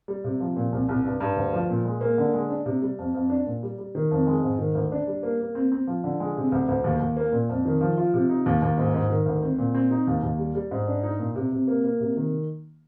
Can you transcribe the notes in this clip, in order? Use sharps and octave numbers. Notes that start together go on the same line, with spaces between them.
G3
C3
F3
A#2
C2
C2
G2
G2
D2
F3
A#2
G#3
A#3
D3
G#3
D4
C3
G3
F2
F2
D4
A#2
G3
G3
D#3
F2
G#3
G#2
D#3
D2
D4
G3
A#3
A#3
C4
C4
F3
D3
G#3
C3
D2
D2
D#2
D#2
A#3
A#2
F2
D#3
F3
F4
C3
D#4
D#2
D#2
G#2
G#2
D#3
D2
C4
A#2
C4
D#4
D#2
D#2
G3
G3
G#2
D4
D#4
A#2
C3
C3
A#3
A#3
C3
D#3